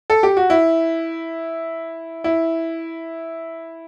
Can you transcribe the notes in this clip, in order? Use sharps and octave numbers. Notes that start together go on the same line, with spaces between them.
A4
G4
F#4
E4
E4